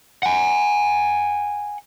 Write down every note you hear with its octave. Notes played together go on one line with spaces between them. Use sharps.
F#5 G#5